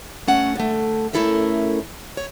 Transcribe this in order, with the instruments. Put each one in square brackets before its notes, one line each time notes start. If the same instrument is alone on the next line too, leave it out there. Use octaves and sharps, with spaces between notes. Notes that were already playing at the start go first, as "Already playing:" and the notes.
[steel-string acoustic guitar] A3 C#4 F#5
D3 A3
A3 C#4 E4 A4 A#4 E5
C#5